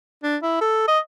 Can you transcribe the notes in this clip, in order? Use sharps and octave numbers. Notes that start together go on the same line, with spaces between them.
D4
E4
A4
D#5